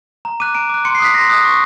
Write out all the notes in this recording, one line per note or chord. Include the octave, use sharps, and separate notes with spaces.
A#5
D6 F#6 D#7
A#5 D7
D6 F#6
C6 C#7
C7
D#6 F#6 B6
C6 A#6
D#6 F#6
C#6